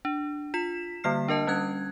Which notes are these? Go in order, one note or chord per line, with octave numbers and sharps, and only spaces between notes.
D4
F4 B6 E7
D3 G3 A#3 F6 C7
D4 A#4 D#5 A5
G3 C#4 F#6 G#6